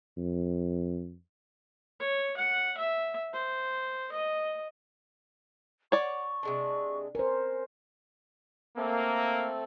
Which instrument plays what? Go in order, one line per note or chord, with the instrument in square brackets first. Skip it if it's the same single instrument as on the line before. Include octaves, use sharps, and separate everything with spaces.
[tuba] F2
[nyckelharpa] C#5
F#5
E5
C5
D#5
[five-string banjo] C#5 D5 [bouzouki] F#5 [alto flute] C#6
[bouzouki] C3 G#3 D4
[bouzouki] C#4 [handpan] A#4 C5
[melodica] A3 C4 A4 [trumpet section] A#3